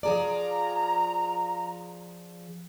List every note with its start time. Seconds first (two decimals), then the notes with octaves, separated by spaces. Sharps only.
0.03 F3 G#4 D5 A#5